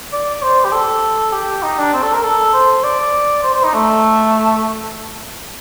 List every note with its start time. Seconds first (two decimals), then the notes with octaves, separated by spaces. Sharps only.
0.13 D5
0.43 C5
0.65 G4
0.73 A4
1.33 G4
1.63 D#4
1.78 D4
1.93 C4
2.03 A4
2.13 A#4
2.23 A4
2.53 C5
2.84 D5
3.43 C5
3.54 C5
3.64 D#4
3.74 A3